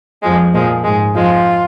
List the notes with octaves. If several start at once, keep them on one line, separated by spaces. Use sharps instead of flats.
F2 F3 G#3
A#2 F3 G#3
G#2 G#3
F2 F3 G#3 F4